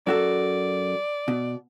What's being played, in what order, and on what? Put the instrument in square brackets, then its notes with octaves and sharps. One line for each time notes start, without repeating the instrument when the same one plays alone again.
[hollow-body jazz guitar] F#2 F#4 A4 [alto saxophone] D5
[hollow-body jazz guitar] B2